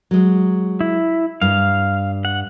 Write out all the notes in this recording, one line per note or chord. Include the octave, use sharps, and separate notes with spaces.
F#3 G#3
E4
G2 F5
F#5